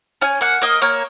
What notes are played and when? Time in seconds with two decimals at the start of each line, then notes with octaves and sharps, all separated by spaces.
0.21 C#4 G#5
0.41 A#3 F#5
0.62 A#3 D#5
0.82 A#3 C#5